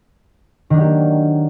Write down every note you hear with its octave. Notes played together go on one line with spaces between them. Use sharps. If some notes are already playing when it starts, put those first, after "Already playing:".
D#3 F#3 A#3 D4 G4